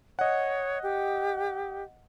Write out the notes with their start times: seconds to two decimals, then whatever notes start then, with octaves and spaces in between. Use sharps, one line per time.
0.19 C#5 D#5 F#5
0.83 G4